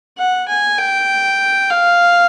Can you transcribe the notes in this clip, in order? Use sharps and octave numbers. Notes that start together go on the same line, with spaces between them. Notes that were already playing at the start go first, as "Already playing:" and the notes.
F#5
G#5
G5
F5